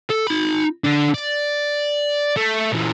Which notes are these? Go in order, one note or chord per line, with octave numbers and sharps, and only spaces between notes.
A4
D#4 B5
D3 D4
D5
A3
A#2 E3